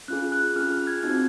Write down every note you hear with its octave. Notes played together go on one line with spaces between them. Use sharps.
C#4 F4 G#4 F#6
F#6
C#4 F4 G#4 F6
F6
G#6
C4 D#4 F#4 G#6